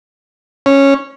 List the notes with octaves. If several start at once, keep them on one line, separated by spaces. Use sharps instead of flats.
C#4